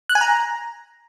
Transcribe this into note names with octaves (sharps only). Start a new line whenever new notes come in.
F#6
G#5
A#5